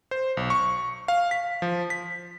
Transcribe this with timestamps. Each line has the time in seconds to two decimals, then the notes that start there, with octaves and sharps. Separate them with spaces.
0.11 C5
0.37 B1
0.50 C#6
1.08 F5
1.31 B6
1.62 F3
1.90 B6